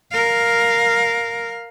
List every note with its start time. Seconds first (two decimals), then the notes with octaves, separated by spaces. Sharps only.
0.12 A#4 F5